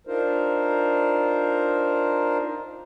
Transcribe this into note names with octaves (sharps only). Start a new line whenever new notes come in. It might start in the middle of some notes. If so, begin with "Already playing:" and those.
D4 D#4 F4 A#4 C5